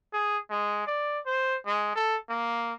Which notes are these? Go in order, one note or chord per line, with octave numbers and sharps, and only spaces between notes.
G#4
G#3
D5
C5
G#3
A4
A#3